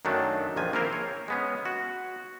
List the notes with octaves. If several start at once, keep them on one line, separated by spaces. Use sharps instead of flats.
F#2 D#3 F#3 A3 D4
A#1 D#3 F3 G#5
A#3 C4 E4 F4 A#4 C5
C#5
G#3 B3 C#4
F#4